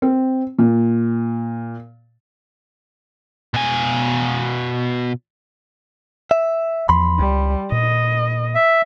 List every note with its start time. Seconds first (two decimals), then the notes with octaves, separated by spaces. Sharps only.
0.02 C4
0.59 A#2
3.54 B2 G#5
6.31 E5
6.89 E2 F3 B5 C6
7.19 C#2 G3
7.72 A#2 D#5
8.55 E5